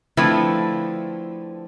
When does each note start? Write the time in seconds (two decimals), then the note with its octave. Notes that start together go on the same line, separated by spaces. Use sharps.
0.17 D3 F3 A3 C4 E4 B4